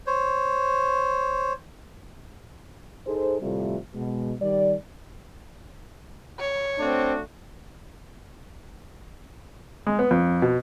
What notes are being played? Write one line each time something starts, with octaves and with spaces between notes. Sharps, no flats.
C5 C#5
D#4 G#4 A4 C5
A2 C3 F3 G3 A3 F4
B2 G#3
D#3 G3 D5
C#5
A3 C4 D4 F#4
G#3
B3
F2
B2